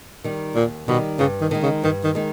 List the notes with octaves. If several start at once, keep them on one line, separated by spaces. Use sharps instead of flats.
D#3 G3
D#2 A#2
B2 D#3 G3
G2 C#3
D#3
D#3 G#3
C#3
G2 D#3
D#3
D#3 G#3